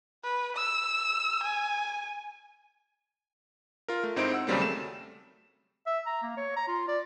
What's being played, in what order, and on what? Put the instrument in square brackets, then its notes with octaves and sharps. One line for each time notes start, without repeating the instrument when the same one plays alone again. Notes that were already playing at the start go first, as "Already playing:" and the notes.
[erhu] B4
E6
G#5
[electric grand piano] F4 A#4
A3
G#2 C4 D#4 E4 C5 D7
F#5 E6
D#2 C#3 F#3 G3 A#3 C4
A3 E7
[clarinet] E5
A#5
A#3
C#5
A#5
F4
D5